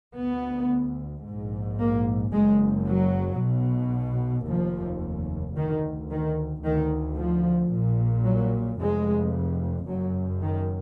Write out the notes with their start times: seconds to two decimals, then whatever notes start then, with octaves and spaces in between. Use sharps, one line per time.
0.16 D2 B3
1.25 A#1 G#2
1.79 A#3
2.32 F#1 F#2 G#3
2.85 F#3
3.39 B1 B2
4.47 F1 D#2 F3
5.56 D2 D#3
6.10 D#3
6.64 D2 D#3
7.17 F3
7.72 A#1 A#2
8.25 F#3
8.80 F1 F2 G#3
9.87 F#1 F#2 F#3
10.41 D#3